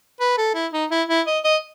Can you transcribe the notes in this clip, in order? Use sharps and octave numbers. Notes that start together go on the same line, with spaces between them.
B4
A4
E4
D#4
E4
E4
D#5
D#5